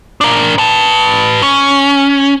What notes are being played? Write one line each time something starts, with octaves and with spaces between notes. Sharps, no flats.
D4 A#4
B4 A5
C#4